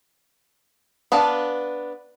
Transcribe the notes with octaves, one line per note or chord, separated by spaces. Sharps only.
B3 D4 F5 A5